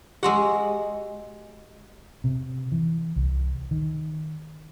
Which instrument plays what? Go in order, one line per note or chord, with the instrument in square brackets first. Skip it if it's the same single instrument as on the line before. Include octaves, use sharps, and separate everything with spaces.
[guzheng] G#3 F#4 F#5 [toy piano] G4 C6 E6
[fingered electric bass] C3
E3
C2
D#3